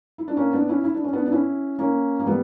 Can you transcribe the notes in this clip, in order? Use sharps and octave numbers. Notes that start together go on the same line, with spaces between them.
E4
D4
A#3 C#4
B3 D4
C#4 E4
E4
D4
C#4
B3 D4
D4
C#4 E4
A#3 C#4
A#3
G3 B3